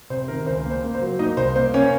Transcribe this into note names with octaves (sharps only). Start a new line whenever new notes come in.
C3 C5
D#3 A#4
C#2 C5
A#3
C5
A#3
C5
F#3
A#3 D#4 D#5
C2 C5
A#3 C5
A#3 C#4 C#5